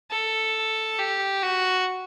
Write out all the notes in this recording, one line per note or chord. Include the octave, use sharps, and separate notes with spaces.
A4
G4
F#4